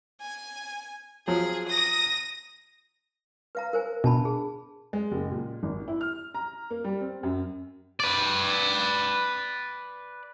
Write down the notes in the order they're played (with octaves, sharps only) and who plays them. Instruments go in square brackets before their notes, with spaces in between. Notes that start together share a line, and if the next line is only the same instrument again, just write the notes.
[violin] G#5
[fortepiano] F3 F#3 [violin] G#4
[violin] D#6 A#6
[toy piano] B4 F5 A#5
A#4 C5 G#5
[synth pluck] B2 [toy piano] D4 A5 B5
[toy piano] G#4
[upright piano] G#3
F#1
A#2
G#1
E4
F6
A#5
A#3
G3
C4
F#2
[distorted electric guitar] B4 D5